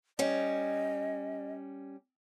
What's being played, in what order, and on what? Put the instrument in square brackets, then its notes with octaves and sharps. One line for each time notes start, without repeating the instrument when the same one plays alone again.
[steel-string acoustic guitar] G3 C#4 [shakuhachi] D#5